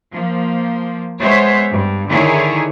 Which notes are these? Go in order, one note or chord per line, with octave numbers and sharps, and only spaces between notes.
F3 A#3
G#3 B3 C5 C#5 E5
G2
D3 D#3 E4 G#4 C#5